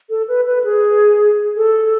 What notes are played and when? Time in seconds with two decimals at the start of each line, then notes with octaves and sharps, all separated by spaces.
0.10 A4
0.28 B4
0.46 B4
0.64 G#4
1.56 A4